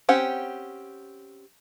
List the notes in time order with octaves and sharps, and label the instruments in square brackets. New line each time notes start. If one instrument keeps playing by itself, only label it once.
[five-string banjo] C4 C#4 G4 F#5